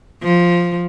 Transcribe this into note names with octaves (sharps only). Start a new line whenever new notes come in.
F3